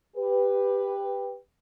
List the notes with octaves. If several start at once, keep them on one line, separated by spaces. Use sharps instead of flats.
G4 B4